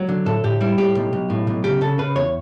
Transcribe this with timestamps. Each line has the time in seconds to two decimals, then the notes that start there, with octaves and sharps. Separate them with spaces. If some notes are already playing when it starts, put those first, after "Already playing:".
Already playing: F#3
0.09 D3
0.26 A2 A4
0.44 A2 G4
0.61 G3 E4
0.78 A2 G4
0.95 B1
1.13 B1
1.30 A2
1.47 B1
1.64 C#3 G4
1.81 C#3 A4
1.99 C#3 B4
2.16 E2 C#5